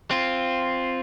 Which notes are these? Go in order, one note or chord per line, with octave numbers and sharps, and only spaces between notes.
C4 F4